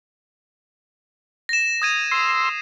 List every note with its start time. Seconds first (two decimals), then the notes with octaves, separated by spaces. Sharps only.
1.49 A#6 E7
1.82 D#6 G#6 D#7
2.11 C6 E6 C7